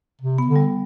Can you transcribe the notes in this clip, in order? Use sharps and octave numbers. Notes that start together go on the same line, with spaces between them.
C3
B3
D3
G3